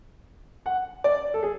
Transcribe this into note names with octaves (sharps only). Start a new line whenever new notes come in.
F#5
D5
A4
G#4